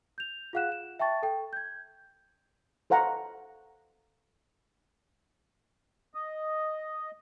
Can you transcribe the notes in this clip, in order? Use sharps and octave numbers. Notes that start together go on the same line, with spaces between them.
G6 F7
F4 G#4 F5 F#5 F#6 E7
E7
E5 G5 A5 C#6 A6
A4 G5
G6 G#6
A4 C5 F5 F#5 A#5
D#5